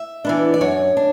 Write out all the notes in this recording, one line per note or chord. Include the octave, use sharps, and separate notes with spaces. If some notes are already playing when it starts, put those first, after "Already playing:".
Already playing: E5
E3 B3 D4
D5
F#2 C#5
D4